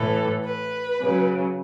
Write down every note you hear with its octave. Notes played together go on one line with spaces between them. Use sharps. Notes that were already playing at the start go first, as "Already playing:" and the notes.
Already playing: A2 E3 A4
B4
C#3 F#3